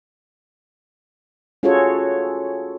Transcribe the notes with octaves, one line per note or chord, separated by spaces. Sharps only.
C#4 F4 F#4 G#4 A4 C#5